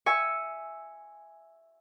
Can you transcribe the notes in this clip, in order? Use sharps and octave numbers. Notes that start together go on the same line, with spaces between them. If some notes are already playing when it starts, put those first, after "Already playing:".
E5 G#5 C#6